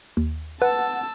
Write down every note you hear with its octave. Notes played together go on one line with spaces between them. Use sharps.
D#2
B4 F#5 A5 E6